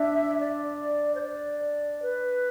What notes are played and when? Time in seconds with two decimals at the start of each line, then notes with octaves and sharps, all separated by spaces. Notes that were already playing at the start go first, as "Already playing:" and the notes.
Already playing: D4 E5
0.40 D5
1.15 C5
1.21 D5
2.02 B4